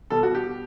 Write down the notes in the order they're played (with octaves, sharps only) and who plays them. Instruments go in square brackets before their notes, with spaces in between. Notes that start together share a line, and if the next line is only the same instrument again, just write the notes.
[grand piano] B2 G3 A4
F#4
G4